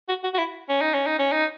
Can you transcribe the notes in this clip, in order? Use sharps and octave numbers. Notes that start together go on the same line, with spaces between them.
F#4
F#4
F#4
E4
C#4
D#4
C#4
D#4
C#4
D#4